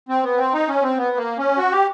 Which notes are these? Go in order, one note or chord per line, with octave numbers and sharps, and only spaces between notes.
C4
B3
C4
D#4
C#4
C4
B3
A#3
C#4
F#4
G4